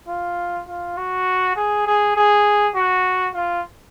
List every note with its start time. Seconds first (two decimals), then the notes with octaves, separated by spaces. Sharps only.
0.08 F4
0.68 F4
0.97 F#4
1.56 G#4
1.86 G#4
2.16 G#4
2.75 F#4
3.35 F4